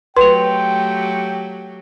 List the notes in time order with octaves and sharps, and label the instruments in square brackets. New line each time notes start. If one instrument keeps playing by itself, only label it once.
[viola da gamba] F#3 A3 G4 [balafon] B4 [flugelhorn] G5 [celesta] C6 F7